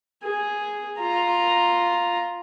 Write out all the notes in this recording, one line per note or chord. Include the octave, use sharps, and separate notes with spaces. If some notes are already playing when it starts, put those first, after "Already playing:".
G#4
F4 A#5